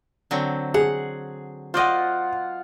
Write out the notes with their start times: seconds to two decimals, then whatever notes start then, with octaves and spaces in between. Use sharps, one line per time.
0.31 D3 F#3 C4
0.74 G#4 F#5
1.74 F4 C5 D5 D#5 F#5